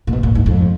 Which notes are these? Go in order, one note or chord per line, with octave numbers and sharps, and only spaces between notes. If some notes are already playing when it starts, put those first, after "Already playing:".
A#2
B2
A#2
G#2
F2